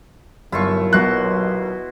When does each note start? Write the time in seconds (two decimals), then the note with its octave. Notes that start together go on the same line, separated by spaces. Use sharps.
0.52 G1 D#2 A#2 F#3 E4 F4 C#6
0.93 B1 B2 F#4 C6 F#6